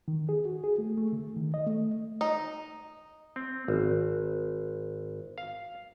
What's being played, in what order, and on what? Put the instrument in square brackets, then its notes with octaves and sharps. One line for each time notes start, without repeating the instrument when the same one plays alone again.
[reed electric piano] D#3
G#4
F#4
G#4
A3
A3
D3
D#3
D#5
A3
[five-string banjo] D#4
[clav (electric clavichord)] C4
G#1
F5